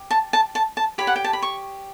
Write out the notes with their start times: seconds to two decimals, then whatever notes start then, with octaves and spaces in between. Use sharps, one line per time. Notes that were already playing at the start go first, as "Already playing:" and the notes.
Already playing: G4
0.11 A5
0.33 A5
0.55 A5
0.77 A5
0.98 G4 C#5 B5
1.07 F#5
1.16 G5
1.24 A5
1.33 B5
1.42 C#6